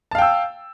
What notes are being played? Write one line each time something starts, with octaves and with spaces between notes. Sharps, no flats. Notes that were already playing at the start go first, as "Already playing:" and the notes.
F5 G5 A5 E6